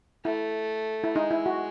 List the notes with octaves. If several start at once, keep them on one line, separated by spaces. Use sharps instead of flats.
A3 E4
E4
G#3 D#4
E4
F#4